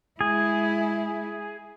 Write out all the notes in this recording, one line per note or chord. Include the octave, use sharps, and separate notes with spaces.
G#3 E4 G#4